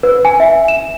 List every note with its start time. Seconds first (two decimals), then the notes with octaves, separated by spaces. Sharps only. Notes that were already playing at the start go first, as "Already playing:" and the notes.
0.03 B4
0.25 G#5
0.40 E5
0.68 E7